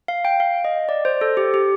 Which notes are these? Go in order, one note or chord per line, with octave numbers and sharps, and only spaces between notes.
F5
G5
F5
D#5
D5
C5
A4
G4
G4